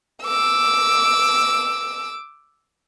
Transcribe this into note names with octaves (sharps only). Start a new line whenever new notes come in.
D6 E6